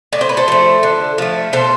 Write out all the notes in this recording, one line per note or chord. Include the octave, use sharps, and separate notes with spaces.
A2 D5
C5
B4
A4 C5
F3 A3
D3
F3 A3
B2 A4 C5